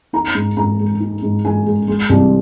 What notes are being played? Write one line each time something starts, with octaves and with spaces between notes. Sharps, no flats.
D#4 A#5
G#2
G#2 A#5
G#3
D#4
G#2
G#2 G#5
G#3
G#3
C2